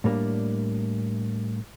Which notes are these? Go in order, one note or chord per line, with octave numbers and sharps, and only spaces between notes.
A2 G3 A#3 C#4 D4